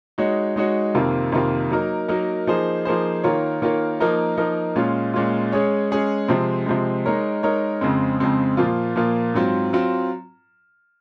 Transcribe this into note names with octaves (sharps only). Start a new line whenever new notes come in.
G#3 D#4 F#4 C#5
G#3 D#4 F#4 C#5
F2 C3 D#3 A#3 F4
F2 C3 D#3 A#3 F4
F#3 A#3 D#4 A#4
F#3 A#3 D#4 A#4
F3 A#3 D#4 G#4 C5
F3 A#3 D#4 G#4 C5
D#3 A#3 F4 A#4 C#5
D#3 A#3 F4 A#4 C#5
F3 A#3 D#4 A#4
F3 A#3 D#4 A#4
A#2 G#3 C#4 F4
A#2 G#3 C#4 F4
G#3 C#4 G#4 C#5
G#3 C#4 G#4 C#5
C3 F3 G#3 C4
C3 F3 G#3 C4
G#3 D#4 A#4 C#5
G#3 D#4 A#4 C#5
F2 C#3 G#3 C4
F2 C#3 G#3 C4
A#2 F3 A#3 F4
A#2 F3 A#3 F4
G#2 F#3 C4 F4
F#3 C4 F4